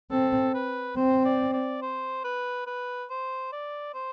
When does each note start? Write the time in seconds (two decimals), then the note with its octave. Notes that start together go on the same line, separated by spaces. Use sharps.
0.11 C4 A4
0.55 B4
0.97 C4 C5
1.25 D5
1.53 D5
1.82 C5
2.24 B4
2.67 B4
3.10 C5
3.52 D5
3.94 C5